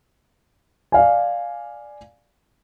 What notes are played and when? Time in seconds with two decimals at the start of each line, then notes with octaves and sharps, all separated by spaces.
0.92 D5 F5 G#5